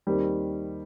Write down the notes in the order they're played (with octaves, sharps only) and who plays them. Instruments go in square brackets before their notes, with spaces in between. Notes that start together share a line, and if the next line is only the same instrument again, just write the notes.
[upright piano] D#2 D#3 G3 C4